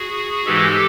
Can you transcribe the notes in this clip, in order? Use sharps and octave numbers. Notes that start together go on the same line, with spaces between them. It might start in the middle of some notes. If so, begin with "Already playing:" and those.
Already playing: F#4 G#4
G#2 E3 G#3 G4 A4